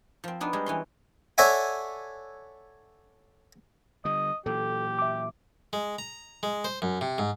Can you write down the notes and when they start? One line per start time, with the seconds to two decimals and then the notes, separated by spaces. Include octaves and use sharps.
0.24 F3 C4
0.40 B3 D4 D#4
0.53 G3 G#3 G#4
0.66 E3 C#4 C6
1.38 A4 C#5 D5 E5 F#5 G#5
4.05 D3 G3 D#5
4.46 A#2 E3 F#3 G4 A4
4.99 E5 D6
5.73 G#3
5.98 A#5
6.43 G#3
6.64 C5
6.82 F#2
7.01 C3
7.18 G#2